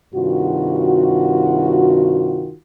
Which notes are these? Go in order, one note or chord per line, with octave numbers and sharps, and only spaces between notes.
G2 C3 D#3 F4 F#4